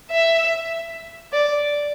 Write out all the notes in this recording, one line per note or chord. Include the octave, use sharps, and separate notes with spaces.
E5
D5